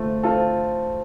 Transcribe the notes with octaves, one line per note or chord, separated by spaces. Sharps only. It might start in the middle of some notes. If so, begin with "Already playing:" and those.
Already playing: A3 C4 F4
C4 F4 A4